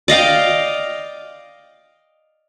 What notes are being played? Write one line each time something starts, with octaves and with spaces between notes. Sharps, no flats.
D5 D#5 F5 G5